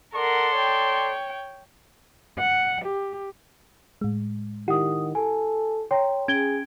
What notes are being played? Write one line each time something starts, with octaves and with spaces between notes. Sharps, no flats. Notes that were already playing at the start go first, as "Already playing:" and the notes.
A4 A#4 D5 F#5 C6
C#5 G5
F#5
G4
A2 G#3
D#3 E4 G4 F#5 D#6
A4 G#5
C#5 G5 A#5 C6
C#4 G#4 G5 G#6 D7 G7